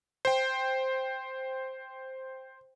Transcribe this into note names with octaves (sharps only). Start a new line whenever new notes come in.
C5 G5